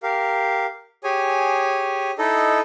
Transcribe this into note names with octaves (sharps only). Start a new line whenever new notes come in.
G4 A#4 F5
G4 G#4 C#5 G#5
D#4 E4 A4 D#5